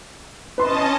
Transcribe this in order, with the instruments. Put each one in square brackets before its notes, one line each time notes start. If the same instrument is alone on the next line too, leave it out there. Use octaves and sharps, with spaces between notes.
[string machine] C#4 D#5 A5 [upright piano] B4 C6